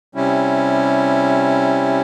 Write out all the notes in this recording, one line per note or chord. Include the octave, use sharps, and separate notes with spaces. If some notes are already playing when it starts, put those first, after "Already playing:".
C3 G3 C#4 E4